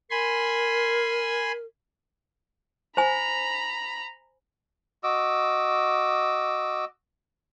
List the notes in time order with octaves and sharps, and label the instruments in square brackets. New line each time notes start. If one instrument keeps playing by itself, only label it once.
[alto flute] A#4 [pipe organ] G#5 B5 C6
[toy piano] C5 G#5 [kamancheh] A#5 B5
[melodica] F#4 D#5 D6 E6